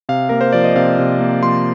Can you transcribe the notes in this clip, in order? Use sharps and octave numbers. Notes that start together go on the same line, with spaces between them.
C3 F5
A#3 A#4
C5
F3 D5
D#5
C3 F5
C3
A#3
F3 C6